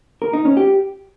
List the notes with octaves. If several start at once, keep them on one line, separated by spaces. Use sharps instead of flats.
A#4
D#4
C#4
G4